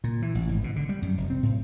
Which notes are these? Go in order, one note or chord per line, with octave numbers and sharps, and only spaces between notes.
A#2
E3
A1
G#1
B2
D3
G3
F#2
F1
C4
A2